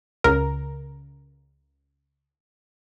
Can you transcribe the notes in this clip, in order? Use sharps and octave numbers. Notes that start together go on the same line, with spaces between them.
C#2 A#4